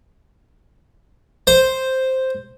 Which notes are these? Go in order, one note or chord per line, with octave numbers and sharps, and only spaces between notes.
C5